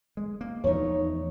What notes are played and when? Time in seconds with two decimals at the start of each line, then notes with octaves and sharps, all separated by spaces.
0.17 G#3
0.41 A#3
0.64 E2 F3 A3 D#4 C#5